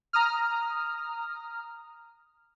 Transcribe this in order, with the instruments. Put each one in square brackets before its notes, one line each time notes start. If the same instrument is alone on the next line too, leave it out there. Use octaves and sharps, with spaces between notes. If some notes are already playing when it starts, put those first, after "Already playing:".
[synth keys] A#5 D#6 F6